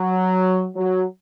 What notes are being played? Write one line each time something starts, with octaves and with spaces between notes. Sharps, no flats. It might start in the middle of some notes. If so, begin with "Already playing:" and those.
Already playing: F#3
F#3